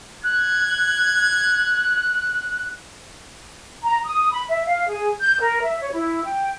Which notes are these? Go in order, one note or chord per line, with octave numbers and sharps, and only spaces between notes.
F#6 G#6
A#5
D#6
B5
E5
F5
G#4
G6
A#4
E5
C#5
E4
G5